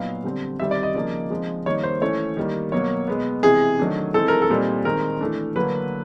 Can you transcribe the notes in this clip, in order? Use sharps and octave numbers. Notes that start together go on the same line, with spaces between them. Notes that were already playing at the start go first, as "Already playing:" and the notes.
Already playing: A#2 F#3 B3 D#4 F5
D3 G3 C4
D#3 G3 C4 E5
D5
D#5
C#3 F3 A#3 D#4 D5
F3 G#3 C4 D#4
D#3 G3 A#3 D#4 C#5
C5
E3 A3 C#4 C#5
D#3 G3 A#3
B2 F#3 A#3 C#5
B2 G#3 B3
C3 E3 G#3 G#4
D#3 F#3 A3 D4
E3 G#3 C4 D#4 A4
A#4
A4
A#2 G3 C4 D#4
D#3 G#3 C4 D#4 A#4
E3 A3 D4
D3 F#3 A#3 B4